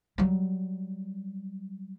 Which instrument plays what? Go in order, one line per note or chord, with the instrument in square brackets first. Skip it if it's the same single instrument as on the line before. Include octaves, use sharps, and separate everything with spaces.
[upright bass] F#3 G3